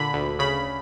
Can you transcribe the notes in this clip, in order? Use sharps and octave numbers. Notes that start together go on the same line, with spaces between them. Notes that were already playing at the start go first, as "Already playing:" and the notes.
Already playing: A#2 D3 B5
D2
C#3 B5